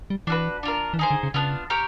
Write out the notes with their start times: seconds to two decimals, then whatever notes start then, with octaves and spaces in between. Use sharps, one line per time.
0.10 G3
0.27 E3 D4 F#4 B4
0.63 D4 F4 A#4
0.94 E3
0.99 D#3 D#4 G#4 C5
1.11 D3
1.23 C#3
1.34 C#3 B3 D4 F4
1.70 G4 A#4 C#5